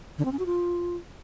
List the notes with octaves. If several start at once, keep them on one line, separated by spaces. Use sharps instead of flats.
D3
C4
C#4
F#4
F4